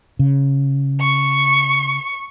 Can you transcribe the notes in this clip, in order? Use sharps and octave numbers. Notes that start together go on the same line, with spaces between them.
C#3
C#6